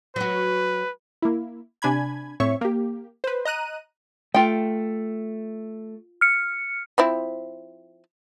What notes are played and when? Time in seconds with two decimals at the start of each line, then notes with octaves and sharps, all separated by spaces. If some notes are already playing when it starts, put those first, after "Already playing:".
0.16 F#3 F#4 B4
1.22 A#3 E4
1.82 C3 D4 G#5 B5 G#6
2.40 A2 C4 C#5 E5 C#6
2.61 A#3 G4
3.24 B4 C5
3.45 D#5 A#5 F#6 D#7
4.34 A3 F4 G5
6.21 F6 C#7
6.98 F3 C4 E4